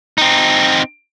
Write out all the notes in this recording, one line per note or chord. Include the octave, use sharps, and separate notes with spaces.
C4 D#4